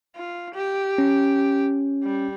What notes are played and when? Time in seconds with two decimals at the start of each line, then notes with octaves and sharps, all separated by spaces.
0.16 F4
0.54 G4
0.98 C#4
2.03 G3